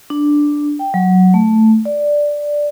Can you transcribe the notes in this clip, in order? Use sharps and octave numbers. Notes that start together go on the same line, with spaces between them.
D4
G5
F#3
A3
D5